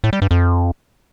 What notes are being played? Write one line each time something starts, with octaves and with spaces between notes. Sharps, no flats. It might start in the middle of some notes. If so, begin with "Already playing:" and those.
A2
G3
G2
F2